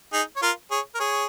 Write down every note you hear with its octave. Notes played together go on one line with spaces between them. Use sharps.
D#4 G#4
C#5
F4 A#4
G#4 C#5
A#4
G#4 C#5